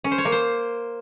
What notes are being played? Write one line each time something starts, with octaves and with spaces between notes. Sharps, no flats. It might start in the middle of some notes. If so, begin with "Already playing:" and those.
C#4
C5
C#5
A#3
C5